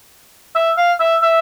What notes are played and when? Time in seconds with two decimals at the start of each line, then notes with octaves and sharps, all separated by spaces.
0.55 E5
0.77 F5
1.00 E5
1.22 E5